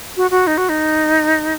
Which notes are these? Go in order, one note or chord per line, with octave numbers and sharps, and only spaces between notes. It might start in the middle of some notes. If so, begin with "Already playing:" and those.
F#4
F#4
D#4
F#4
D#4